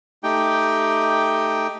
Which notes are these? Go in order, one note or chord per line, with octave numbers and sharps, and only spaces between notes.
A3 D#4 G4 G5